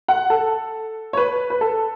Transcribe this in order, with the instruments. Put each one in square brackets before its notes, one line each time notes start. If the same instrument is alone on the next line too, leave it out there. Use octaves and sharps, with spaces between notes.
[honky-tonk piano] F#5
A4
C#5
B4
B4
A4